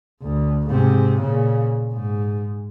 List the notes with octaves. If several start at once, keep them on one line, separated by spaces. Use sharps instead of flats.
D2
G#2 C3
A#2 C#3
G#2